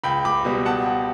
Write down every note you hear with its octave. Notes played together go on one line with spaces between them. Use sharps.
C#2 G5 B5
B5 D6
B2 G3
F#5 A5